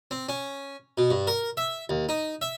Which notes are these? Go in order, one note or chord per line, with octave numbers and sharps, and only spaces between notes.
C4
C#4
B2
G2
A#4
E5
D#2
D#4
E5